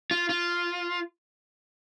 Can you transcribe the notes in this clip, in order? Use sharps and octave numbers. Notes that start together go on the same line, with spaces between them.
F4
F4